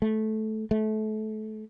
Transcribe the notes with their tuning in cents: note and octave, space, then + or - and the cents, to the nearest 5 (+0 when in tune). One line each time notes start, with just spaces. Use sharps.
A3 -15
A3 -25